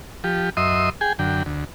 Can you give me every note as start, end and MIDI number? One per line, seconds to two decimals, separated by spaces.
0.24 0.50 53
0.24 0.50 67
0.57 0.90 42
0.57 0.90 75
0.57 0.90 76
0.57 0.90 84
0.57 0.90 87
1.01 1.13 68
1.01 1.13 79
1.01 1.13 80
1.19 1.43 42
1.19 1.43 50
1.19 1.43 79
1.46 1.65 38